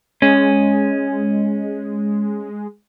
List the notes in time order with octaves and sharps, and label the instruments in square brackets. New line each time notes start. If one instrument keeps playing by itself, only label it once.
[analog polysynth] G#3 [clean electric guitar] C#4